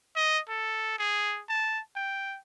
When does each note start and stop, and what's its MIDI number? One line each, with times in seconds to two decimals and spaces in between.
0.16 0.39 75
0.49 0.95 69
0.99 1.41 68
1.49 1.80 81
1.96 2.38 79